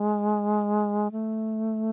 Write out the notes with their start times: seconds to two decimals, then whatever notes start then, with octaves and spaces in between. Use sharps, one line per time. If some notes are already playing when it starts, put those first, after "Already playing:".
Already playing: G#3
1.12 A3